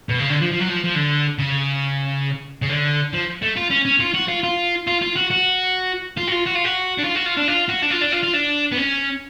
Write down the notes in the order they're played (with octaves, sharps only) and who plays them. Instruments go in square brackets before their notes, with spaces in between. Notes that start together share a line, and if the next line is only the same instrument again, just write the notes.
[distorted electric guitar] B2
C#3
D3
F3
F3
F#3
F3
F3
D3
C#3
C#3
D3
F3
A3
F4
C#4
C#4
F4
F#4
F4
F4
F4
F4
F#4
F#4
F4
F#4
F4
F#4
F4
F#4
D4
F4
F#4
F4
D4
F4
F#4
D4
F4
D4
F4
F4
D4
B3
C#4